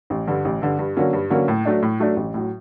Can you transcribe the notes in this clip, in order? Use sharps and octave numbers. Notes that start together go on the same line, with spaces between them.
A1
G2 D3
A1
G2 D3
G2
D3 F#3 A#3 C#4
G2
D3 F#3 A#3 C#4
A2
F#3 A3 D4
A2
F#3 A3 D4
A1
A2 F#3